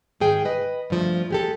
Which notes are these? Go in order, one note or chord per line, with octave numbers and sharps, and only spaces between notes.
G#2 D#3 G#4 G5
B4 D#5
G2 F3 A3
G#3 G4 A4